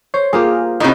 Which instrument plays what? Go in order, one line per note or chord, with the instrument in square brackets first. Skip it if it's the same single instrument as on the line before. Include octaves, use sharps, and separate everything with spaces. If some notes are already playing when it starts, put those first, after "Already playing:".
[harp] C5 [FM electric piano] C#5
[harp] A#3 F4 G4 [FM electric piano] G#4 A#4
[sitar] A2 C3 [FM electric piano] D#4 D#5 G6